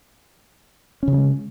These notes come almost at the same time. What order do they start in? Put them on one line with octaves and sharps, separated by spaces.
C#4 C#3 F3 G#3